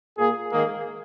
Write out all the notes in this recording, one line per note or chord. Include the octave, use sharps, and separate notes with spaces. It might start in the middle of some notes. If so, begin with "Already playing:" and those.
A#2 A#3 G#4
G#2 D#3 A#3 G#4